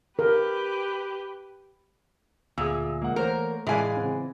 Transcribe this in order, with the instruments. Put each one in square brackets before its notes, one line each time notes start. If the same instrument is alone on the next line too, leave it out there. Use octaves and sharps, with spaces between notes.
[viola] G4 B4 [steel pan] A#4
[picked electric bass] D2 [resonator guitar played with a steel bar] A#2 [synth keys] G#4 G#5 [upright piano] D#6 E6
[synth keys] G#3 [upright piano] A#3 F#5
[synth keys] E3 C5 C#5 [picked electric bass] A3 [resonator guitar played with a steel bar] A#4
[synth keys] A2 F5 F#6 [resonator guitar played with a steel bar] E3 G#5 [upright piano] G#3 D5
[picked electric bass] C#3 B3 C4